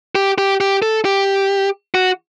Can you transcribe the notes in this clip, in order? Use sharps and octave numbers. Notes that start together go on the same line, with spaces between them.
G4
G4
G4
A4
G4
F#4